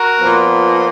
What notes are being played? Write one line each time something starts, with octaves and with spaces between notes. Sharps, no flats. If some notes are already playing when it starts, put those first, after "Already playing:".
Already playing: F#4 A#4
A#2 F3 B3